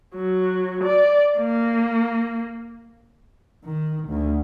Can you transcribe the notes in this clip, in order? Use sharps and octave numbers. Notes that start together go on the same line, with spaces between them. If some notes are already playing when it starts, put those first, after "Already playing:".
F#3
D5
A#3
D#3
D2